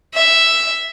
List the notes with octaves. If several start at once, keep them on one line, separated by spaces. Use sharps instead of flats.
E5